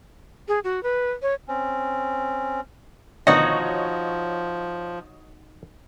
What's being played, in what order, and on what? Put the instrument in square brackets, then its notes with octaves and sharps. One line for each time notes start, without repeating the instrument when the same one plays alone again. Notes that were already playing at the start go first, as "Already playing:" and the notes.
[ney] G#4
F#4
B4
C#5
[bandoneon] C4 C#4
[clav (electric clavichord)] D2 B2 D#3 [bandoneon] F3 [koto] D#4 F#4 [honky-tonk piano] C#5 D#5